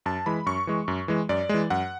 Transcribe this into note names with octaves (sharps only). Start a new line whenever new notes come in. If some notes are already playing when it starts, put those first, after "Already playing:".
F#2 A5
E3 G#3 B5
F#2 C#6
E3 G#3
F#2
E3 G#3
F#2 D5
E3 G#3
F#2 F#5